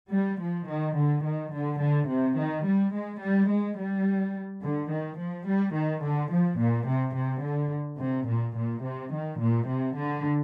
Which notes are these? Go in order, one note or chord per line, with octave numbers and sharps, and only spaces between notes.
G3
F3
D#3
D3
D#3
D3
D3
C3
D#3
G3
G#3
G3
G#3
G3
D3
D#3
F3
G3
D#3
D3
F3
A#2
C3
C3
D3
C3
A#2
A#2
C3
D#3
A#2
C3
D3